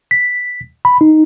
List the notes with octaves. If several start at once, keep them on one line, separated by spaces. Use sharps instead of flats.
B6
B5
D#4